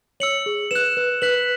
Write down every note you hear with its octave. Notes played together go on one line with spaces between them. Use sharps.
C#5 E6 C#7 F#7
G#4
B4 F#6 E7
B4
B4 F#6 B6 F#7